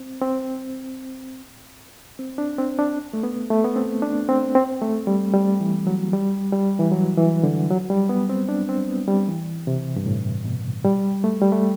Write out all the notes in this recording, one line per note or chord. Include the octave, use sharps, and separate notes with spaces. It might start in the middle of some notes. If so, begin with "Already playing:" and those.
Already playing: C4
C4
C4
D4
C4
D4
A3
B3
A3
B3
C4
D4
C4
C4
A3
G3
G3
E3
F#3
G3
G3
E3
F#3
E3
D3
F#3
G3
B3
C4
D4
C4
B3
G3
E3
C3
G2
A2
B2
G3
A3
G3
A3